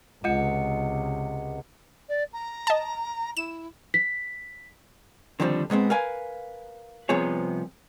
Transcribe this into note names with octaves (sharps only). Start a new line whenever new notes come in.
C#2 C3 G#3 F4 D#5 F#5 C#7
D5
A#5
D#5 A5
E4 E7
B6
D3 D#3 F3 G3 A#3 C4
A#2 G#3 B3 C4
A#4 B4 F5 G#5
C2 C3 F3 B3 G#4 C#5